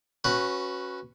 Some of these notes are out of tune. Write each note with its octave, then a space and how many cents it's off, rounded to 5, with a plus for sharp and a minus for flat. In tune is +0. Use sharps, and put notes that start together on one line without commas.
C#4 -15 F#4 +0 B4 +0